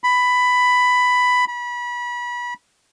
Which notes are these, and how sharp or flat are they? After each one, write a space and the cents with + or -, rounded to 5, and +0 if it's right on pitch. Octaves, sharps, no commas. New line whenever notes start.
B5 +10
B5 -30